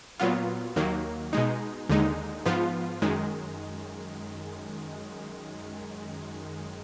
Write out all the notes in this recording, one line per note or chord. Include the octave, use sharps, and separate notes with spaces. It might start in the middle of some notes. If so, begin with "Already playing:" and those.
A#2 F#3 B3 F4
D#2 D#3 F#3 A#3
B2 G#3 D#4
D#2 D3 G#3 D#4
G#2 F3 B3 F4
F#2 D#3 G#3